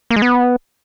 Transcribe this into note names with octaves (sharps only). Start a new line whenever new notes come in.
A#3
G#3
B3